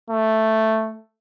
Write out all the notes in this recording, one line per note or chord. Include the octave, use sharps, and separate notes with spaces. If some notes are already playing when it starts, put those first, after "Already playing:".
A3